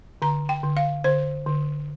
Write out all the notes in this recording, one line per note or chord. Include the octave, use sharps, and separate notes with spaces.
D3 A#5
G5
D3
F5
D3 C5
D3